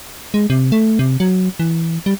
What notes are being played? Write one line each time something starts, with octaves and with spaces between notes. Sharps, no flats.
G#3
C3
A3
C3
F#3
E3
G3